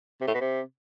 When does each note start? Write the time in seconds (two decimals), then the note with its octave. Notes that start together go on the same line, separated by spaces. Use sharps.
0.21 C3
0.28 A2
0.34 B2
0.41 C3